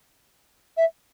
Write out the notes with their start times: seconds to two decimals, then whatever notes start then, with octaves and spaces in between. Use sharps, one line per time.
0.77 E5